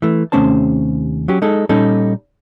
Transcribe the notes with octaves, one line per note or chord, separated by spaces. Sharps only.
E3 A3
D#2 C3 A3 C#4 C5 A5
F#3 C#4 G4
G#3 D#4 A4
A#2 G3 C#4 D#4 A4